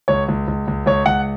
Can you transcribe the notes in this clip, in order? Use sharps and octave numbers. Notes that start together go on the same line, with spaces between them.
C#2 C#5
C#2
C#2
C#2
C#2 C#5
C#2 F#5